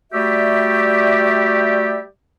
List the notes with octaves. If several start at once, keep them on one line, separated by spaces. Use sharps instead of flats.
G3 A3 F#4 G4 D5 E5